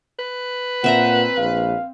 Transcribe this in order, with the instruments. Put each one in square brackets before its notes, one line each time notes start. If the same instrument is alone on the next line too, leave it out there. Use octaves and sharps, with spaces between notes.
[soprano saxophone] B4
[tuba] A#2 [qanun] C4 E5 A#5 [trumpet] F#5
[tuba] A#1 [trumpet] F5